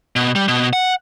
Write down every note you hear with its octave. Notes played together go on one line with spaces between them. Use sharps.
B2
G3
B2
F#5